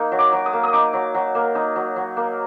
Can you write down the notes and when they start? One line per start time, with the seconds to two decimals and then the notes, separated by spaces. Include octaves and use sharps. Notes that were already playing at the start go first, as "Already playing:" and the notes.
Already playing: A#3 D#4
0.12 F#3
0.19 D6
0.33 F#3
0.46 D#6
0.53 A#3
0.63 D#6
0.73 D#4 D6
0.93 F#3
1.14 F#3
1.35 A#3
1.55 D#4 D#6
1.76 F#3
1.96 F#3
2.17 A#3